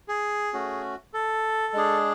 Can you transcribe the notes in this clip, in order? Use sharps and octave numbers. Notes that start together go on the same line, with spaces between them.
G#4
A3 C#4 F#4
A4
G#3 D4 G#4